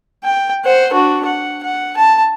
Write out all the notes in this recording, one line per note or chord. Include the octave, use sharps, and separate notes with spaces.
G5
C5 F#5
D4 F#4
F#5
F#5
A5